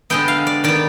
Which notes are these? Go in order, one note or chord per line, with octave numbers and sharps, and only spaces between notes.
D3 G#3 B3 G5
F5
D5
D#3 B3 D5